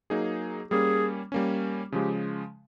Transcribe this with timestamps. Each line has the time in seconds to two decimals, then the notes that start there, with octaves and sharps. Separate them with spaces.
0.10 F#3 A#3 D#4 G#4
0.71 G3 A#3 C#4 G#4
1.32 G3 A#3 C#4
1.92 C#3 F3 G#3 G4